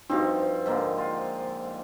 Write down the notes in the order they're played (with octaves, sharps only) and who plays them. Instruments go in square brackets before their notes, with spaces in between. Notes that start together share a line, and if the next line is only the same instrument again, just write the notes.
[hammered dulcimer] G2 F3 C4 [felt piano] D#4 F#4
[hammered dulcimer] G#2 D3 A#3
F4